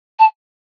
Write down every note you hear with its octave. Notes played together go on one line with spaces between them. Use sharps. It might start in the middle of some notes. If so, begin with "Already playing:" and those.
A5